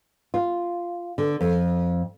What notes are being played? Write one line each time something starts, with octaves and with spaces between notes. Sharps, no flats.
F4
D3
F2